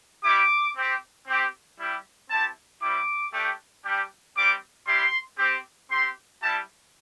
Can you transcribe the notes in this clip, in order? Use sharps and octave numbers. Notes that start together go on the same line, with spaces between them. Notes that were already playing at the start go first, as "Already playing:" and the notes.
G3 E4 G4 D6
C4 G4
C4 G4
G3 E4 G4
C4 E4 G4 A5
G3 C4 E4 G4 D6
A3 D4 G4
G3 D4 G4
G3 C4 G4 D6
G3 E4 G4 C6
C4 G4
C4 G4 C6
G3 E4 G4 A5